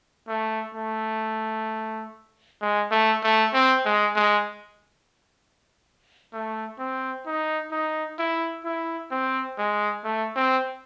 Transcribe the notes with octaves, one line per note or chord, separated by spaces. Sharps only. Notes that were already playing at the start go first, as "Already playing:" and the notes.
A3
A3
G#3
A3
A3
C4
G#3
G#3
A3
C4
D#4
D#4
E4
E4
C4
G#3
A3
C4